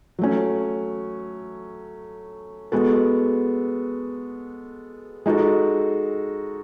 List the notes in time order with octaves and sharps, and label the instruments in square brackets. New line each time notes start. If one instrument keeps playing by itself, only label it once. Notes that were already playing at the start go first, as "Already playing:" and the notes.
[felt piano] F#3 A3 C#4
G#3 B3 F#4 A4
G#3 D#4 F#4 A4